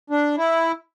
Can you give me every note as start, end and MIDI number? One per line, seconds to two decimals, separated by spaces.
0.10 0.36 62
0.38 0.72 64